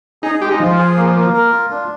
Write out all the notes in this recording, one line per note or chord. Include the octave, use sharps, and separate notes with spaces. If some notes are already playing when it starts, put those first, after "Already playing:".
D#4 G#4
G#3 G4
D#4
F3 F4
G#4
A#3
A#3
A#4
F4
D4